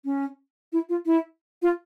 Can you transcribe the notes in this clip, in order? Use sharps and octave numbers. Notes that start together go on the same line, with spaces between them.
C#4
E4
F4
E4
F4